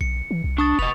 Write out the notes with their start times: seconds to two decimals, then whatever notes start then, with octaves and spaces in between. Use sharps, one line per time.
0.01 B1 C#7
0.31 E3
0.44 C2
0.58 D4 C#6 D#6 A6
0.79 E1 B4 D#5 F7